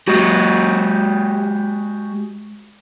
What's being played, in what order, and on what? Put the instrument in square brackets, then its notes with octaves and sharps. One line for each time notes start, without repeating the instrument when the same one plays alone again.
[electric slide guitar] G#3 F#4 G4